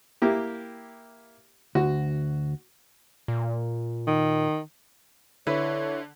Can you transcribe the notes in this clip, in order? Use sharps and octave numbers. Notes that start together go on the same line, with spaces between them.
A#3 E4 G4
D2 F#4
A#2
D#3
D3 E4 B4 C#5